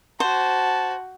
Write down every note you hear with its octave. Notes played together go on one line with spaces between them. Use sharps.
F#4 C5 A5